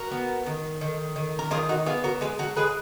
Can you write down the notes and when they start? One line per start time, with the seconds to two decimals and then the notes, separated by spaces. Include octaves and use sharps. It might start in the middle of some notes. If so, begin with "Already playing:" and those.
Already playing: F#4 A#4
0.11 B3
0.46 D#3
0.81 D#3
1.16 D#3
1.39 A#4
1.51 D#3 F4 G#4
1.69 D#4 F#4
1.86 B3 F4 G#4
2.04 F#4 A#4
2.21 G#3 G#4 B4
2.39 F#4 A#4
2.56 G#3 G#4 B4